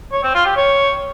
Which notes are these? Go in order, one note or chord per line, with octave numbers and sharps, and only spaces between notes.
C#5
C4
F4
G4
C#5